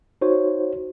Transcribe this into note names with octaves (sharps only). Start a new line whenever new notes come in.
D#4 F#4 C5 C#5